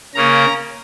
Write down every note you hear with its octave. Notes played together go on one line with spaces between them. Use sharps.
C#3 A#3 C#4 A#5